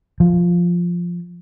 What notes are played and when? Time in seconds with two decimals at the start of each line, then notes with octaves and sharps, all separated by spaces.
0.20 F3